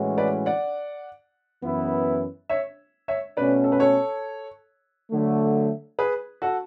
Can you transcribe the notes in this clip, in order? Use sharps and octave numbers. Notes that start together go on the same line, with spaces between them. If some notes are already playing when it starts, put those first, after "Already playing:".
Already playing: A2 E3 G#3 C#4 F#4
B4 D5
D5 F#5
F#2 E3 B3 E4 B4
C#5 E5
C#5 E5
B2 A3 C#4 B4 D5
A4
B4
A4 C#5
D3 F#3 A3
G#4 B4
F#4 A4